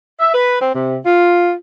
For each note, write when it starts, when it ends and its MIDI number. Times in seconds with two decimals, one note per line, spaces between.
0.20 0.33 76
0.34 0.57 71
0.60 0.69 60
0.74 0.97 48
1.06 1.54 65